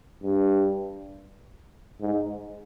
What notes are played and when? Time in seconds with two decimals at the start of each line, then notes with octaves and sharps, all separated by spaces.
0.23 G2
2.01 G#2